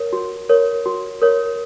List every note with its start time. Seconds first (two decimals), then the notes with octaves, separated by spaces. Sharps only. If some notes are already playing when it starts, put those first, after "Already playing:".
Already playing: A#4 C#5
0.13 F#4
0.49 A#4 C#5
0.86 F#4
1.22 A#4 C#5